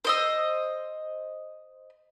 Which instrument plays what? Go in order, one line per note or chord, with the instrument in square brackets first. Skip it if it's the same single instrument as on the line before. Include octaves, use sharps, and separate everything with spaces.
[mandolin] C5 D#5 E6